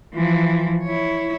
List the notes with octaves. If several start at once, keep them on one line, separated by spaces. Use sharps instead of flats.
E3 F3
E4 C#5